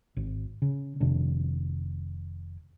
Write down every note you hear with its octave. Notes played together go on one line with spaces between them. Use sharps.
G#1
C#3
F1 C3 D#3 D4